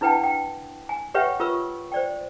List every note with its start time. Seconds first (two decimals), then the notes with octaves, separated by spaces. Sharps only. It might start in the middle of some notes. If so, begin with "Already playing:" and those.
0.01 D4 E4 B4 F#5 G5 A5
0.24 G5
0.89 G#5
1.14 G4 B4 C#5 E5 F#5 G5
1.40 F4 A#4 B4 C#6 E6
1.92 C5 D5 G5